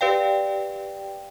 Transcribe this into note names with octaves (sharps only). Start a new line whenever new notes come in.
G4 B4 D5 F5 G5